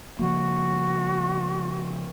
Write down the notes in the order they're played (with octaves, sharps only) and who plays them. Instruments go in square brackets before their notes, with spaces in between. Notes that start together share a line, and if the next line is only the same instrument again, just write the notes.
[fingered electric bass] C#3 F3 A#3 [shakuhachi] F#4